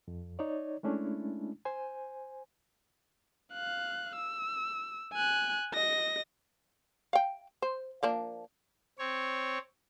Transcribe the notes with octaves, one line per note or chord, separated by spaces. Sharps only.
F2
D#4 C#5 D5
G#3 A3 C#4 D4 E4
C5 G#5
F5 F#6
E6
G#5 F#6
D#5 A#6
F5 G5
C5
F3 A#3 D4
C4 C#5